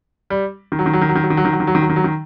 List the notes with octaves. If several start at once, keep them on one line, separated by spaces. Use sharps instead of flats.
G3
D#3
F#3
D#3
F#3
D#3
F#3
D#3
F#3
D#3
F#3
D#3
F#3
D#3
F#3
D#3
F#3
D#3
F#3
D#3